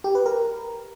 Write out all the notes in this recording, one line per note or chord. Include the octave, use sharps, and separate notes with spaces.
G4
B4
A#4